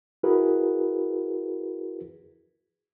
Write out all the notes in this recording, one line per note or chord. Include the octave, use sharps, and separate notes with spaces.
E4 F#4 G#4 A#4 B4